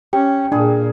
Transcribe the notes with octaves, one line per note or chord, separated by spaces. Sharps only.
C#4 G4 G5
A#2 D4 G#4